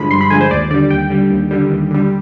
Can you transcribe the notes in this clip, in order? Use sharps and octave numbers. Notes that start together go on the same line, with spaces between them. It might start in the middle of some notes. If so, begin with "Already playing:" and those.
Already playing: G2 D3 F3 G#3 B5
G2 C6
B5
D3 F3 G#3 G#5
C5
D#2 D5
D3 G3 D5
D#2 G5
D3 G3
D#2
D3 G3
D#2
D3 G3